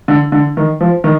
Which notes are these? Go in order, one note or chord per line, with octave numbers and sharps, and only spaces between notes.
D3
D3
D#3
F3
D#3